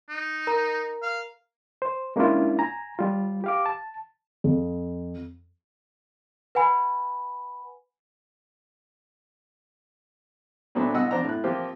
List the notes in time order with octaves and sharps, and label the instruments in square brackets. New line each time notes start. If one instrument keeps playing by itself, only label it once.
[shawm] D#4
[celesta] A#4 A#5
[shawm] F5
[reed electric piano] C5
G#3 A#3 C#4 D4 E4 F4
G#5 A#5
G3 F4
G4 F5 D6
A5
[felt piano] F2
[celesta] B4 F#5 G#5 B5
[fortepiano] A#2 F#3 A3 B3 C4 D4
C2 B2 D#5 F#5 E6
F2 C4 D4 C5 D5 A#5
A2 F#6
F3 A#3 C4 F4 G4